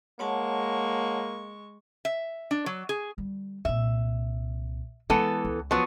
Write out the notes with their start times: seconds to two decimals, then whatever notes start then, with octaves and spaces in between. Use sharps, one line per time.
0.19 G#3 A#3 C#5 F#5 A5 C#6
2.05 E5
2.51 D4
2.66 F#3
2.89 G#4
3.18 D3 G3
3.65 C2 A#2 E5
5.10 E3 G#3 B3 A4
5.45 C#2
5.71 F3 F#3 B3